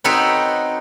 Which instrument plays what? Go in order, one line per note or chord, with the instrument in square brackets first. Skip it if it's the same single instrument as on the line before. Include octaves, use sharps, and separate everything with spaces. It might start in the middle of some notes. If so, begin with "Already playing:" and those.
[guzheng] C4 D#4 F#4 A4 B4 C#5